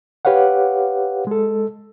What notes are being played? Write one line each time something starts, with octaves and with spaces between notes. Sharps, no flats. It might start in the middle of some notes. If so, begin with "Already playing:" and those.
G4 B4 C#5 F5 F#5
G#3 A4